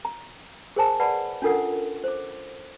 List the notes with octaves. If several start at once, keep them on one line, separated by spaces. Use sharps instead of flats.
A#5
G#4 A#4 C5 G#5 A5
B4 D5 F#5 A5 B5
C#4 D4 F4 A4 A#4 F#5
C5 D6